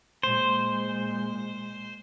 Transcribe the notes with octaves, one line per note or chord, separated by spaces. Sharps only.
A#2 G#3 C5